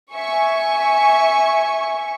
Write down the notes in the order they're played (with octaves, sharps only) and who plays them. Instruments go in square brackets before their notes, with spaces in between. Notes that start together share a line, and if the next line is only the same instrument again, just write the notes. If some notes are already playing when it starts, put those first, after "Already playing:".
[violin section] E5 G#5 C#6